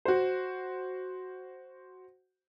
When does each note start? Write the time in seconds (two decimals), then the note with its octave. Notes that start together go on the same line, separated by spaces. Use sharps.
0.05 F#4 C5